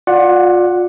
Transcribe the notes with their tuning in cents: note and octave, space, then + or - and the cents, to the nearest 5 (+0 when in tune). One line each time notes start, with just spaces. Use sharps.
F4 +30 D5 +0 F#5 +0